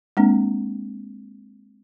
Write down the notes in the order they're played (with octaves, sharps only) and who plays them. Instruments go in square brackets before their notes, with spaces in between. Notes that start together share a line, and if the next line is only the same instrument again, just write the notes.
[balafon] G#3 A#3 C4 D4